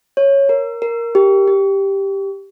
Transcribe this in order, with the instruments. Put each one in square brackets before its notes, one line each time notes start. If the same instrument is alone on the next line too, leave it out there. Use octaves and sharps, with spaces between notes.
[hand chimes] C#5
A#4
A#4
G4
G4